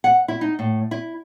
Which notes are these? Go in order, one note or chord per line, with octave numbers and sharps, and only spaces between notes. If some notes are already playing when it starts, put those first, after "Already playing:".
F#5
E4
D#4
A2
E4